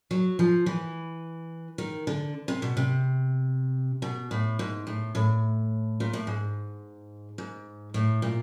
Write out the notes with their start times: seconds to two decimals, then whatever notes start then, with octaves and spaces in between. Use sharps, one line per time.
0.11 F#3
0.39 F3
0.66 E3
1.78 D#3
2.07 D3
2.48 C3
2.62 B2
2.77 C3
4.02 B2
4.31 A2
4.59 G#2
4.87 A2
5.15 A2
6.00 A#2
6.13 A2
6.27 G#2
7.38 G#2
7.94 A2
8.22 A#2